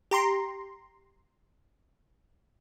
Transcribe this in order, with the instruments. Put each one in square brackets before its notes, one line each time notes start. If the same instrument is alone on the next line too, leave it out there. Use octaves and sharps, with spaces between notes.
[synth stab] G4 A#5 C6